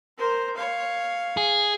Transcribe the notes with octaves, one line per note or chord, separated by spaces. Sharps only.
A#4 C5
C#5 F5
G#4